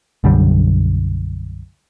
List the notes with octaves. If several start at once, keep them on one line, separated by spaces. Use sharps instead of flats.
B1 F#2 D3 G3